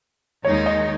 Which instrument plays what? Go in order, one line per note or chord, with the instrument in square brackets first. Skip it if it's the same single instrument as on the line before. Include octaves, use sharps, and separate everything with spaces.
[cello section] D#2 D#3 G#3 D#4 [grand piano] C#5
[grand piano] D#5